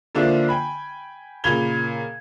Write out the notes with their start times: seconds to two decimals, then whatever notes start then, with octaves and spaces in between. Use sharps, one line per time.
0.15 D3 F3 A#3 D4 E4 F4
0.49 G5 G#5 B5
1.44 A#2 C#3 B5 G#6 F7 G7